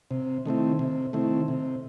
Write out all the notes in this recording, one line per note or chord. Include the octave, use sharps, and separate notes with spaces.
C3
D#3 A3 C4 E4
C3
D#3 A3 C4 E4
C3